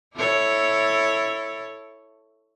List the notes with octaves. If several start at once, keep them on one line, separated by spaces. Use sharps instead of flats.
E4 A4 C#5